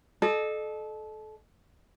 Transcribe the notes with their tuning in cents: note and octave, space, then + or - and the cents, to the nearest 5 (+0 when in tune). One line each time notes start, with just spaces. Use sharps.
A4 -25 D#5 -40